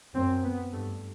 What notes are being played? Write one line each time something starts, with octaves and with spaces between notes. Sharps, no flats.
F#2 C4
B3
G2 A3